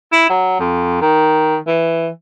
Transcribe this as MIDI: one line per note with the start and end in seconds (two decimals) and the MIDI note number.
0.12 0.29 64
0.30 0.58 54
0.60 1.00 41
1.01 1.57 51
1.67 2.09 52